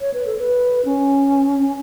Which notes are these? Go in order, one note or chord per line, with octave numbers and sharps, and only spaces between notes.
C#5
B4
A4
B4
C#4